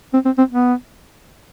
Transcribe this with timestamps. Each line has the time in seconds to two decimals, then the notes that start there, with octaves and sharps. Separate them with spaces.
0.13 C4
0.25 C4
0.38 C4
0.51 B3